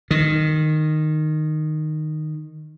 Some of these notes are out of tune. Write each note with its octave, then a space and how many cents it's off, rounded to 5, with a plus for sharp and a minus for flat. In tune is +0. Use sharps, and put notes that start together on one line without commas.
D#3 -10